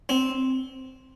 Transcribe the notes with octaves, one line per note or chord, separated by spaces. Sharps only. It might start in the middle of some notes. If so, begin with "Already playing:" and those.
C4